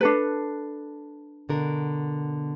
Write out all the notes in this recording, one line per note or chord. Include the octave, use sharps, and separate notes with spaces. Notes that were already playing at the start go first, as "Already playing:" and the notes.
D4 A4 B4
B2 D3 A#4